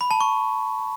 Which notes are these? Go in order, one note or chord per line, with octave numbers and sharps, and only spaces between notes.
B5
A5
C#6